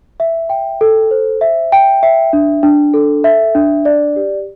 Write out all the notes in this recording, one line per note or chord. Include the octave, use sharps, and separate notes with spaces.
E5
G5
A4
C5
E5
G5
E5
D4
D4
A4
E5
D4
D5
G4